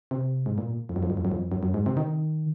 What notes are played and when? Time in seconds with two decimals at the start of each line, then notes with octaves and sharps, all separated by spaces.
0.11 C3
0.46 G#2
0.58 A#2
0.89 F2
0.96 F#2
1.03 F2
1.10 F#2
1.17 F2
1.25 F#2
1.32 F2
1.52 F#2
1.63 F#2
1.74 G#2
1.86 C3
1.97 D#3